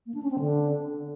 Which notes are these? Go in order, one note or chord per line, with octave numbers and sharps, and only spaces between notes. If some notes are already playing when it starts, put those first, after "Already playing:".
A#3
D4
C#4
C4
D3